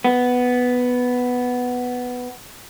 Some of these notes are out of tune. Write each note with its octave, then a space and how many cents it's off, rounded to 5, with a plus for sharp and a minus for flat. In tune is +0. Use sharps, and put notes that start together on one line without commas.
B3 +5